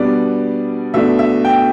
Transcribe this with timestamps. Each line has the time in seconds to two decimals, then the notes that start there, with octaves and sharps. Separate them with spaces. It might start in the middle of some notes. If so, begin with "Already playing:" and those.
Already playing: B2 G3 B3 D4 D5
0.94 B2 A3 D4 E5
1.19 E5
1.45 G5